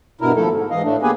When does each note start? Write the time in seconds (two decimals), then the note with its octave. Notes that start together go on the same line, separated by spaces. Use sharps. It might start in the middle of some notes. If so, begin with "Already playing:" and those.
0.21 G2 B2 E4 A#4
0.36 D#2 F3 A3 E4 A4
0.51 G#2
0.70 G#2 E3 D#5 F5
0.83 A2 A3 D4
1.03 A#3 B3 G4 G#4 B4 G#5